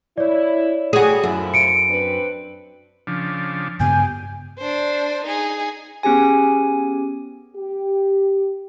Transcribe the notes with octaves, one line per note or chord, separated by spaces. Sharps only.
E4 C#5 D5
G3 F#4 G#4
F#2 F3 A3 E4
C#7 D7
C4 D4 B4
C#3 F3 D4
G2 C#3 B3 G4 G#5
D4 C5
D#4 G#4
B3 C#4 G4 G#4 G#5
G4